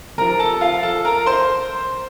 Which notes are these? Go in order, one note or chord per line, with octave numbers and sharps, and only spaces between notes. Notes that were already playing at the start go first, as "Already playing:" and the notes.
C3 F3 A#4 A#5
A4 A5
F4 F5
A4 A5
A#4 A#5
C5 C6